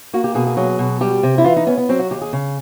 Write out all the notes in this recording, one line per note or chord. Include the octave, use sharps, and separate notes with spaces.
A#3 F#4
G4
B2 G#4
G#4
F#3 G#4
B2
G3 G4
C3
E4
E3 F4
D#4
B3 C#4
B3
F#3 C4
F#4
D#2 G4
G#4
C#3